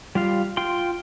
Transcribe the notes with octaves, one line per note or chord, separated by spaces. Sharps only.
G3 F4 F5
F4 G5 C6